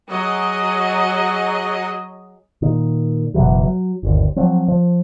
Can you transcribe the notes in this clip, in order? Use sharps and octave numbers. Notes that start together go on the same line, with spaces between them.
F#3 G#4 D#5
A#2 D#3
F#1 B2 E3 F#3
F#3
G1 D#2
F3 F#3 C4
F3